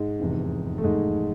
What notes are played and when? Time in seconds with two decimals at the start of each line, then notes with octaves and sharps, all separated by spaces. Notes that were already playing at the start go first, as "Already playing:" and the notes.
Already playing: G#2 G#3
0.19 F1 E2 C3
0.78 A3
0.83 G#2 G#3